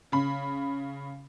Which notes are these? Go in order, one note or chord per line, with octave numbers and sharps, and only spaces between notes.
C#3 B5